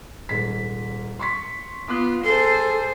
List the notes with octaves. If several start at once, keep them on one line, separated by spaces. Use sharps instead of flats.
D#1 G#2 B6
C6 C#6 B6
B3 F4 D6 D#6 F#6
G#4 A4 C5